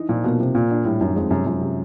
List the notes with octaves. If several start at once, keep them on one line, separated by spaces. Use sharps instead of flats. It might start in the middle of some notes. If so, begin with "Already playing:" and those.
Already playing: E3 D#4
A#2 F3
B2 A#3
C3 F3
A#2 A#3
D4
A2 G3
F#2 D#3
F2 G#3
F#2 C3
F#2 F3
C3